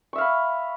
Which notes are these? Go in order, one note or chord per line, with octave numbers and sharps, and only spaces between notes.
E5 F5 B5 C#6